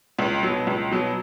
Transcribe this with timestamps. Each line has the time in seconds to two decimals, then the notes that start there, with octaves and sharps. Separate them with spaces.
0.19 C#2
0.43 B2 F#3
0.67 C#2
0.91 B2 F#3